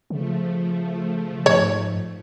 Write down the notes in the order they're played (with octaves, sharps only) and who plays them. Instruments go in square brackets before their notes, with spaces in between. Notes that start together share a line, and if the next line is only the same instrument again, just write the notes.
[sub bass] C#3 [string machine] F3 A3
[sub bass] G#2 [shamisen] C#5